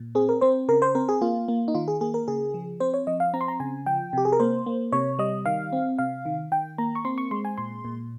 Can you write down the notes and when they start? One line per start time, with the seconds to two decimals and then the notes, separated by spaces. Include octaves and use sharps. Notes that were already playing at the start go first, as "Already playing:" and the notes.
Already playing: A#2
0.15 C4 G#4
0.29 A#4
0.41 C4 C5
0.69 C#3 A#4
0.82 C5
0.95 C4 A#4
1.09 G#4
1.21 A#3 F4
1.48 A#3
1.68 D#4
1.75 D#3 F4
1.88 G#4
2.01 A#3 G#4
2.14 A#4
2.28 C#3 G#4
2.54 F3
2.80 C4 C5
2.94 C#5
3.07 F3 D#5
3.20 F5
3.34 C4 A#5
3.41 C6
3.48 A#5
3.60 C#3 G#5
3.86 F3 G5
4.13 C3 G4
4.25 G#4
4.32 A#4
4.40 A#3 C5
4.66 A#3
4.92 C3 C#5
5.19 G3 D#5
5.46 D#3 F5
5.73 C4
5.99 C3 F5
6.25 D#3
6.52 D#3 G5
6.78 A#3 A#5
6.95 C#6
7.05 C4 C6
7.18 C#6
7.31 G#3 C6
7.45 G#5
7.58 A#2 C6
7.85 A#2